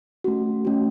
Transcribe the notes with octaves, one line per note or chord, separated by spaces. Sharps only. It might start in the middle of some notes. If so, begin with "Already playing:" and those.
A3 C#4 F#4
A3 C#4 F#4